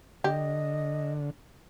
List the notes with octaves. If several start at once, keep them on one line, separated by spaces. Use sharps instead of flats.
D3 G4 D#5